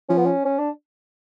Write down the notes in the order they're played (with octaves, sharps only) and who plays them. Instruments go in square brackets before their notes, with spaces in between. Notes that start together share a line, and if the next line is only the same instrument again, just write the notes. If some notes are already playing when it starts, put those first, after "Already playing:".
[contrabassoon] F3 [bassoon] C#4
[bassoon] B3
C#4
C#4
D4